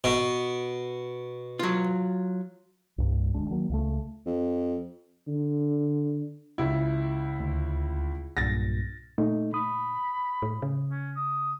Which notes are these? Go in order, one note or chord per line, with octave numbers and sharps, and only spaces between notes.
B2
F#3 F4
C2 G2
D#1 D2 G#3 D4
D#3 F#3 A#3
C#2 C#3 A3
F2
D3
C#2 E4
D2
B1 G2 A#2 A6 A#6
A#2 A3 D#4
B5 D#6
A2
C#3
C#4
D#6